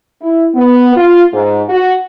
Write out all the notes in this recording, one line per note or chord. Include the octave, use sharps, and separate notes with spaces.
E4
B3
F4
G#2
F#4